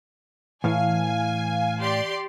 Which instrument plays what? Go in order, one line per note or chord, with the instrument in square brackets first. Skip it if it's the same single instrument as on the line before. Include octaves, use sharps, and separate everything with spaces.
[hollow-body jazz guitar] A2 [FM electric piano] E3 [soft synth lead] F5 [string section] G#5
[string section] G4 D5 C6